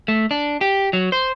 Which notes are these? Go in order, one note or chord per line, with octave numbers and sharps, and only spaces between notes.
A3
D4
G4
F#3
C5